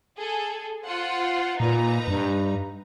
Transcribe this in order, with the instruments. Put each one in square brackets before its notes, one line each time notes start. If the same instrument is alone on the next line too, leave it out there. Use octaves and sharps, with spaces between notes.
[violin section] G#4 A4
F4 C5 F#5
[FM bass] A#2 [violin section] D#4 B4 A#5
[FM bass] G2